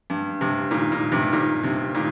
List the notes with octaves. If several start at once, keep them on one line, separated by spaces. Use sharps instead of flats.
G2
G2 C3
A#2 D#3
A#2 D#3
G2 C3
A#2 D#3
G2 C3
A#2 D#3